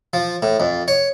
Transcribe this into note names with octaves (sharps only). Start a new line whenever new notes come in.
F3
A2
F2
C#5